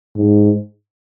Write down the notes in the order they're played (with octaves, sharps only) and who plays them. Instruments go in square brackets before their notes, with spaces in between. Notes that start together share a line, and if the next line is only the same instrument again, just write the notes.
[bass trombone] G#2